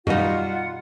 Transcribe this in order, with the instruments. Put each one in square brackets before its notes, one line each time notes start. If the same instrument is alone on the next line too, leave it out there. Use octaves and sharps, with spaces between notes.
[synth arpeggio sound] F#2 D#3 B5 [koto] B2 D#4 [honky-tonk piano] G3 [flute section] F4 F#5